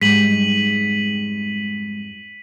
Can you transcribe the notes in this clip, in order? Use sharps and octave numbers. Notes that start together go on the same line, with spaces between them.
F2 G#2 G3 G#3 B6 D#7 F#7